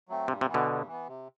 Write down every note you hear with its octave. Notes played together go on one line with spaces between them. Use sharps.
F#3 A3 C4
G2 C3
C3
E3 B3
B2 D3
G2
E3 B3
C3